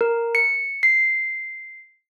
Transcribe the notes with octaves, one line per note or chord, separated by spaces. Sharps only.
A#4
C#7
C7